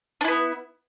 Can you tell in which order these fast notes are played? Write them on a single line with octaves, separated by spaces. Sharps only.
D4 E4 B3